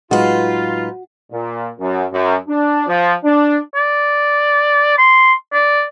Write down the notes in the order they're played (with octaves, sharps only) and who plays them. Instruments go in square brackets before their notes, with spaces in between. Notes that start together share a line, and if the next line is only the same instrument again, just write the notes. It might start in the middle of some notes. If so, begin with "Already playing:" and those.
[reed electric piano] A2 F#3 G#3 [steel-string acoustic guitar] D#4 B4 [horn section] F4 [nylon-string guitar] F#4
[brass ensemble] A#2
F#2
F#2
D4
F3
D4
[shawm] D5
C6
D5